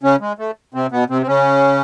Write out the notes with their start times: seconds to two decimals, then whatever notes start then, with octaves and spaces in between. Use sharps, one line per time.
0.03 C#3 C#4
0.20 G#3
0.39 A3
0.74 C3 C4
0.92 B2 B3
1.10 C3 C4
1.22 C4
1.27 C#3 C#4